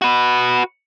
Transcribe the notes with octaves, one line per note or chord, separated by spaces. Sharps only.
F#4 B4